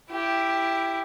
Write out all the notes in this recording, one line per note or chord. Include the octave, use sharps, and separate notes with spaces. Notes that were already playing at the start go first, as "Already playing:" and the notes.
E4 G4